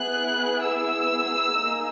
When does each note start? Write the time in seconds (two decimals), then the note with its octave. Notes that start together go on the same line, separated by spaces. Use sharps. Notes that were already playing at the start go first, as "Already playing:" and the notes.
Already playing: B3 E4 G#4 F#6
0.62 E6
1.57 A#3 D#4 G#4